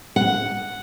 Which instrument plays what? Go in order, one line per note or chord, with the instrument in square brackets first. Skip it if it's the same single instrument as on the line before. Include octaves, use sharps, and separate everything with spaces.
[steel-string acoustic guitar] F#5